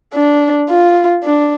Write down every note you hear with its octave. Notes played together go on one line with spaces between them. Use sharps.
D4
F4
D4